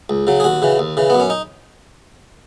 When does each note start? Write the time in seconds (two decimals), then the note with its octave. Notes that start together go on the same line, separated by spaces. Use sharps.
0.09 C#2
0.27 C#3 F#3
0.40 G#4
0.44 D#2 F#4
0.62 C#3 E3
0.79 D#2
0.97 C#3 E3
1.10 F#2 B3
1.20 C#4
1.30 D#4